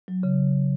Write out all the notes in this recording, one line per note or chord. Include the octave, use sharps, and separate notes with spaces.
F#3
C#3